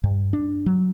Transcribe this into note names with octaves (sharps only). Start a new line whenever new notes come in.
G2
D4
F#3